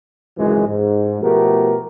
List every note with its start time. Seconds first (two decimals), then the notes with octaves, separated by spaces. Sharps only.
0.38 G#1 C#2 F#2 E3 G#3
0.67 G#2
1.21 B2 F3 A3 B3 G4 A#4